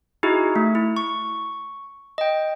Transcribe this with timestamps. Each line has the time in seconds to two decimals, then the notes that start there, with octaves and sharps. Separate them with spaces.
0.23 D#4 E4 F#4 G#4
0.56 A3
0.75 E4
0.97 C#6
2.18 D#5 G5